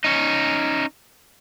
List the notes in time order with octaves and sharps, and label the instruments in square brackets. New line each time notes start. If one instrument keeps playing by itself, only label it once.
[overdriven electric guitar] C#4 D#4